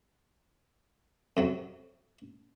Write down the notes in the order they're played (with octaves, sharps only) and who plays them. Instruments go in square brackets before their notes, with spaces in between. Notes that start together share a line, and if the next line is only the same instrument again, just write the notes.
[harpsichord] F2 C3 F#3